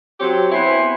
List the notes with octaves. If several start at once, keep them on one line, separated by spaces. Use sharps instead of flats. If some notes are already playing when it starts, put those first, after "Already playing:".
F#3 C4 G4 C#5
B3 C4 E4 C5 G#5